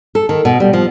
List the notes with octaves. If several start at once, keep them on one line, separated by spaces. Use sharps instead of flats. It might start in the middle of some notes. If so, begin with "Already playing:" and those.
A4
D#3
B2
G3
F3